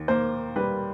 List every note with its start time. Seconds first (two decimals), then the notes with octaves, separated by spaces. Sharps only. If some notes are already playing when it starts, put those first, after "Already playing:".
Already playing: D#2
0.08 A#3 C5
0.56 G3 B4